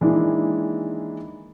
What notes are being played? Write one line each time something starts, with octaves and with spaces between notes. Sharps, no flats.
D#3 E3 G#3 A#3 D4 E4